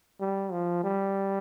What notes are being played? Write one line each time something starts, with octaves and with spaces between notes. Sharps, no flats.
G3
F3
G3